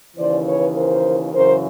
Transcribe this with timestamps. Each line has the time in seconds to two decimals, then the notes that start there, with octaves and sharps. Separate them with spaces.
0.16 D#2 C#3 E3 C5 D5
0.46 B4 C#5
0.74 A#4 C5
1.32 F#2 C#3 E3 A#4 C5